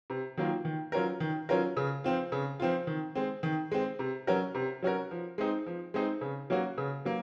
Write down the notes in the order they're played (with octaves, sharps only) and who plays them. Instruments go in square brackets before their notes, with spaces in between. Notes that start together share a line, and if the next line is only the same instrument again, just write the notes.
[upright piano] C3
D#3 F#3 A#3 F4
D#3
F#3 C#4 F4 A#4
D#3
F#3 C#4 F4 A#4
C#3
F3 C4 F4
C#3
F3 C4 F4
D#3
G#3 C4
D#3
G#3 C4
C3
F#3 C#4 F#4 A#4
C3
F#3 C#4 F#4 A#4
F3
G#3 C4 D#4
F3
G#3 C4 D#4
C#3
F#3 A#3 C#4 F#4
C#3
F#3 A#3